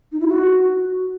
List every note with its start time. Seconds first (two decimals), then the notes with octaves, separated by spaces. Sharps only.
0.12 D#4
0.20 E4
0.28 F#4